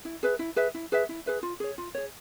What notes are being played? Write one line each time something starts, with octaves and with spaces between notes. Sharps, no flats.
E4
G#4 B4 E5
E4
G#4 B4 E5
E4
G#4 B4 E5
E4
G#4 B4 E5
F4
G#4 C#5
F4
G#4 C#5